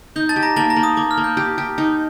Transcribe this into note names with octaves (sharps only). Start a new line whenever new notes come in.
D#4 G6
A5 A6
G4
A#5 A#6
A#3 A5 A6
A#5 A#6
A#3
D#6
A#3 D6
F6
A#3
G6
G4
G4
D#4